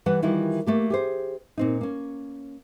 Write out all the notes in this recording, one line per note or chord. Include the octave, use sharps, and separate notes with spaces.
E3 G3 B4 F#5
D#3 E3 G3 E4 F4 A#4
A3 A#3 G4
G4 G#4 C5
A#2 C4 D#4
A#3 C#4